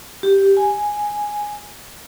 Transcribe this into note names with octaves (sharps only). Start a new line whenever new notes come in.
G4
G#5